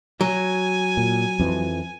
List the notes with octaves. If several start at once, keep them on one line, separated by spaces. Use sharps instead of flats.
F#3 G#5
A#2
F2 E3